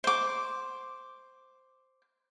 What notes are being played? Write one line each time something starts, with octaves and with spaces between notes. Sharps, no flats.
C5 D6